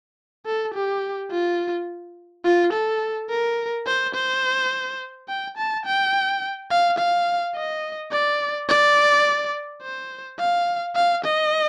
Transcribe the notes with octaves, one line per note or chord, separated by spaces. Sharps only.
A4
G4
F4
F4
A4
A#4
C5
C5
G5
A5
G5
F5
F5
D#5
D5
D5
C5
F5
F5
D#5